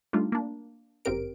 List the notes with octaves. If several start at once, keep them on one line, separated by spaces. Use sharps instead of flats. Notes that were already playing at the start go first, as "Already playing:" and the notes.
G3 A3 D4 D#4 F4
A#3 D4
G1 F#2 C4 G4 A#4 D7